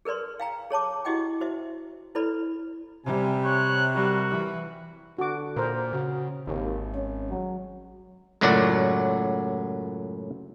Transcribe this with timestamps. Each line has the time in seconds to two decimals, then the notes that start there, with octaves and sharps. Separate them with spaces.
0.05 G#4 A#4 B4 D5 C6
0.40 F5 G5 A#5
0.70 G#4 C#5 A5 D6
1.05 E4 F#4 G4 D#5 F#5 G5
1.41 F#4 C5 E5
2.15 E4 A4 B4 C5 D5 B5
3.06 C3 G3 G#5
3.44 C#5 F#6
3.95 G3 F#4 A#4
4.30 E3
5.19 D3 F#4 D6
5.56 A#2 A#4 C5
5.93 C#3 F#4
6.47 G#1 D#2
6.95 C#4
7.30 F#3
8.41 C#2 F#2 A2 F#3 F#4 D5